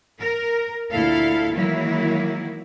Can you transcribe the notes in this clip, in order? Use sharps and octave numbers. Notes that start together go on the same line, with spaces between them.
A#4
D2 A#2 E4 A4 F5
D#3 E3 F#3 G#3 A#3 E4